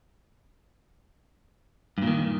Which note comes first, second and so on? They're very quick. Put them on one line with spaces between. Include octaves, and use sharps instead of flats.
G2 A#2 D#3